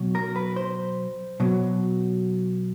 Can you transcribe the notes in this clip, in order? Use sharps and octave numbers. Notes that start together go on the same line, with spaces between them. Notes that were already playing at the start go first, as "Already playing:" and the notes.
Already playing: B2 F#3
A#4
B4
C5
B2 F#3